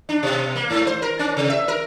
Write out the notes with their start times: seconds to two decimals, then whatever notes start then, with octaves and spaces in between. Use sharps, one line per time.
0.09 D4
0.23 B2
0.55 A#3
0.70 G#2
0.87 C5
1.02 A#4
1.19 C#4
1.37 C3
1.50 E5
1.68 A#4